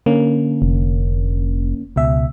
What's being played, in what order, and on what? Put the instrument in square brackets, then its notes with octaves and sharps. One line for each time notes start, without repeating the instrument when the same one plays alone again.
[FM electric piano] D3 A#3 C#4
[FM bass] F1
[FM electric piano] C#2 B2 E5